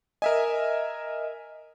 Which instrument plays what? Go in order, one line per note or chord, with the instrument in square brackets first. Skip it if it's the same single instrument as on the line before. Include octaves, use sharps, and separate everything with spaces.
[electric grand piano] A#4 E5 G#5 [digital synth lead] D#5